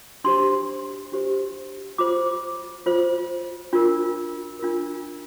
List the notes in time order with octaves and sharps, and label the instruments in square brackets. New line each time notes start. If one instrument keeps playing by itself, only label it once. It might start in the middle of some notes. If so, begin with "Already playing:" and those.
[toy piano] D4 G4 C5 C6
D4 G4 C5
F4 C5 D6
F4 C5
D4 F4 A#4
D4 F4 A#4